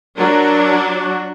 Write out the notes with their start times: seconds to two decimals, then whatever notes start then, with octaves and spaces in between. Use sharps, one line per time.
0.18 F#3 D4 A#4
0.93 F#4